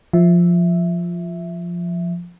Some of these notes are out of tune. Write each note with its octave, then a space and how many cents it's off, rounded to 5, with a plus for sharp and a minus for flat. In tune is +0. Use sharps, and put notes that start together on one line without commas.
F3 +0 E5 +0